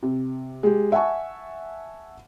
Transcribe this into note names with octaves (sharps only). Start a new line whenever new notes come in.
C3
G#3 G4
E5 F#5 G#5 A5 C#6